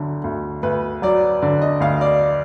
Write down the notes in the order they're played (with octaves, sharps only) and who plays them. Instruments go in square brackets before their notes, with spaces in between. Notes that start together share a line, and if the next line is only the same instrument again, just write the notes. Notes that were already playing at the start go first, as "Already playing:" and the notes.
Already playing: [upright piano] D2 D3 F#3
D2
[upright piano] D2 [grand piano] B4
[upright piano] F#3 [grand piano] D5
[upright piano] D3 [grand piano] D5
[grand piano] D#5
[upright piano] D2 [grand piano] F5
[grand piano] D5